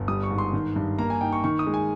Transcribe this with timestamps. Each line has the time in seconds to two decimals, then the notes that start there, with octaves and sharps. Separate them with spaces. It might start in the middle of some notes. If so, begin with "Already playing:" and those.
Already playing: G1
0.08 G3 D#6
0.23 C#6
0.31 G#2
0.38 C6
0.53 D#3
0.76 G2
0.99 A#3 A#5
1.10 G#5
1.21 D#4 G5
1.33 C#6
1.44 D#3 C#6
1.59 D#6
1.67 G#3
1.74 G#5